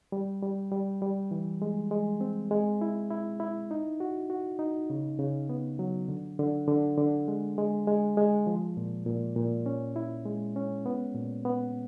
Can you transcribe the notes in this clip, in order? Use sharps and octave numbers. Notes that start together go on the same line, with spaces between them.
G3
G3
G3
G3
E3
G#3
G#3
C4
G#3
E4
E4
E4
D#4
F#4
F#4
D#4
C#3
C#3
B3
F#3
D3
D3
D3
D3
G#3
G#3
G#3
G#3
F3
A#2
A#2
A#2
C#4
E4
G#3
C#4
B3
A#2
B3